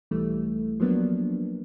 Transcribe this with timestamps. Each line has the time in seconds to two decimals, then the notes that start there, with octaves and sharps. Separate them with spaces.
0.11 B1 E3 G3 A3
0.80 F3 F#3 A#3 B3 D4